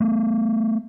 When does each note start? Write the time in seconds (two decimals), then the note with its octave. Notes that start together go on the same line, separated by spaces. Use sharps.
0.01 A3 B3